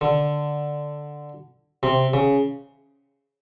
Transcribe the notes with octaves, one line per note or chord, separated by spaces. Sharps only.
D3
C3
C#3